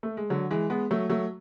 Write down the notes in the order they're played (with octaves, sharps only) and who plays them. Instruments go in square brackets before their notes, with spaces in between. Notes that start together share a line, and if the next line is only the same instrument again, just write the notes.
[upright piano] A3
G#3
D3 F#3
E3 G#3
G#3 B3
F#3 A3
F#3 A3